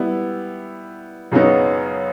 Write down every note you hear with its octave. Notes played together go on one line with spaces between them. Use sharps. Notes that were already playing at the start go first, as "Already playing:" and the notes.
Already playing: G3 B3 E4
F#2 C#3 F#3 B3 D#4